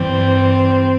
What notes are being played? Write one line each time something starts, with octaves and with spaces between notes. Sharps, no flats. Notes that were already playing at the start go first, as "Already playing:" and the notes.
Already playing: G2 E3 G3 C4